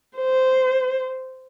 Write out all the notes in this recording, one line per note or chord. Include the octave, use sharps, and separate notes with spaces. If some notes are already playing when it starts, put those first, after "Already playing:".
C5